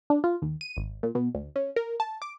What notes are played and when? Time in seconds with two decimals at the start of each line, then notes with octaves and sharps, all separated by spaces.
0.10 D4
0.24 F4
0.42 D#2
0.61 D#7
0.77 G#1
1.03 A#2
1.15 B2
1.35 D2
1.56 C#4
1.76 A#4
2.00 A5
2.22 D6